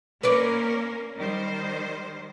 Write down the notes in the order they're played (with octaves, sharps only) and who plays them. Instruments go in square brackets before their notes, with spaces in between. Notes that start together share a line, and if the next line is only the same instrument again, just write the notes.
[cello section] A#3 C#4 A#4 [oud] B4 C#5 D5
[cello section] D#3 G3 C5